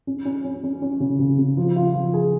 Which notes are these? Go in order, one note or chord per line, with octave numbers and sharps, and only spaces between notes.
C#4
C#4
C#4
C#4
C#4
C#3
C#3
C#3
F3
F4
F3
G#4